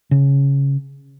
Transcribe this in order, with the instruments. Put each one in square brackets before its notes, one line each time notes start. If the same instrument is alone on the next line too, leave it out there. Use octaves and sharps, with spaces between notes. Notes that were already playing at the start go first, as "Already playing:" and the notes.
[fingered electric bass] C#3